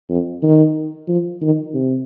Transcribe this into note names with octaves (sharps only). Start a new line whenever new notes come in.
F2
D#3
F3
D#3
C3